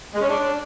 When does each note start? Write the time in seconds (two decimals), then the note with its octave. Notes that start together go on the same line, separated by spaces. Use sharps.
0.13 G#3
0.21 C#4
0.28 D4